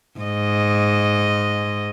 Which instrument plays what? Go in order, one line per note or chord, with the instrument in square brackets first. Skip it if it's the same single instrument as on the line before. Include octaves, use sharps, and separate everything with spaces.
[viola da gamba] G#2 D#5